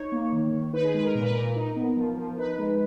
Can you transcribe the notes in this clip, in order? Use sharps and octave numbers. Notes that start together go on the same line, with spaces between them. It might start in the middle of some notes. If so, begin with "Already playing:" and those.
Already playing: D#4 C#5
A#3
D#3
D#3
D#4 B4
G#4
G#3 B4
A#4
A#2 A#4
B4
A#2 A#4
D#4
B3
F3
F3
D#4 B4
G#3